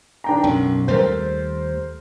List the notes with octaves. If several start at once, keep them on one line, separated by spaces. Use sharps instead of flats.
D4 G5 A#5
B1 F#2
D#2 G3 A3 A#4 C5